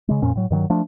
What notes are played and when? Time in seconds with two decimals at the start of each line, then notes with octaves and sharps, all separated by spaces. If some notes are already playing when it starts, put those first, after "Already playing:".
0.08 C#3 G#3
0.22 F2 A#2 C#4
0.35 A2 F#3
0.51 G2 D#3 F3 F#3
0.70 F3 A3 D4